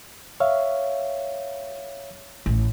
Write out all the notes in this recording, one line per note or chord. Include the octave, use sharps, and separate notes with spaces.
C#5 E5 F5
A1